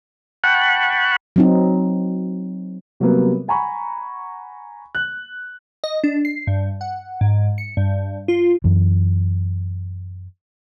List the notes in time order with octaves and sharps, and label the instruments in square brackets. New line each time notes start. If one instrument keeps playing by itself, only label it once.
[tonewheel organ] F#5 G5 A5 B5 C#6 F#6
[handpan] F#3 C4 D#4
[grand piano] C3 F#3 G3 A#3 B3
F#5 G#5 A#5 B5 C#6
F#6
[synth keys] D#5
D4
C7
G2
F#5
G#2
C#7
G2
F4
[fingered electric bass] F#2 E3